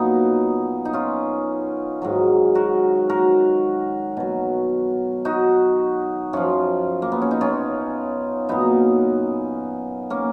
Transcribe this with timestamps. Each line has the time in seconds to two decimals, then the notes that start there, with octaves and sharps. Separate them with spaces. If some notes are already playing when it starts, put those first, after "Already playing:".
Already playing: A#2 F#3 B3 D#4
0.85 D#4
0.93 C#4 F4
2.02 G#2 D#3 F#3
2.55 F#4 A#4
3.10 F#4 A#4
4.17 B2 F#3
5.25 D#4 F#4
6.33 F#2 F3 C#4 F4
7.02 A#3
7.12 B3
7.22 C#4
7.31 D#4
7.41 C#4 F4
8.48 A#2 F#3 B3 D#4
10.10 A#3 C#4